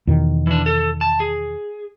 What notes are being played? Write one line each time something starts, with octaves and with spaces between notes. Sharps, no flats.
E2 B2 D#3
E3 D4
A4
A5
G#4